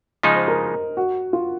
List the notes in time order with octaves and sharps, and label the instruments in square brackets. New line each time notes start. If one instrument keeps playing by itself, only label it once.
[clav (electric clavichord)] C#3 F3 G#3 D#4 [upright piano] D#5
[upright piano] C5
A#4
F#4
F4